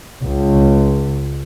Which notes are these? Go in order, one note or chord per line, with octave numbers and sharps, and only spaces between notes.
C#2